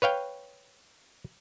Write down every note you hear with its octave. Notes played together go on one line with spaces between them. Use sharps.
B4 C#5 F5 G5